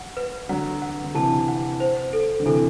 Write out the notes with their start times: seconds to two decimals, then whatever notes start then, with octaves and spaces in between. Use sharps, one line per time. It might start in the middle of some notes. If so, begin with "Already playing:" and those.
Already playing: F#5
0.17 B4
0.49 D3 F#3 F#5
0.82 F#5
1.04 D3
1.14 C3 E3 A5
1.48 F#5
1.80 C5
2.13 A4
2.40 D3
2.45 C3 E3 A4